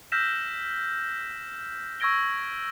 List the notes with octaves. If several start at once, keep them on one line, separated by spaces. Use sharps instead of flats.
E6 F6 G6 A#6 B6 E7
C#6 E6 G#6 A#6 D7 G7